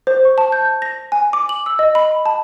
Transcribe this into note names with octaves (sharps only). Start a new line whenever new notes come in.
C5
C#6
A5
G6
A#6
G#5
D6
F#7
E6
D#5
B5
A5